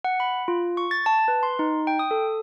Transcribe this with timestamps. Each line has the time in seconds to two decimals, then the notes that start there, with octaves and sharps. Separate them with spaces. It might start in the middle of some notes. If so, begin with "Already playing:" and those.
0.05 F#5
0.20 B5
0.48 F4
0.77 C#6
0.91 A6
1.06 A5
1.28 B4
1.43 C6
1.59 D#4
1.87 G5
1.99 D#6
2.11 A4